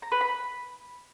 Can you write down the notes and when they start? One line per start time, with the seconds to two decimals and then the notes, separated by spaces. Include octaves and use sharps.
0.02 A#5
0.12 B4
0.21 B5